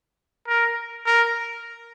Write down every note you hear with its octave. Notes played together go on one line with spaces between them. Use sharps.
A#4
A#4